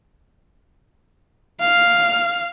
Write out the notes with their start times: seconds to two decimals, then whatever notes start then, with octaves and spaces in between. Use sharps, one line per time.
1.60 F5